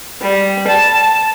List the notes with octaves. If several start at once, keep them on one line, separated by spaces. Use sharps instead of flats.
G3
A5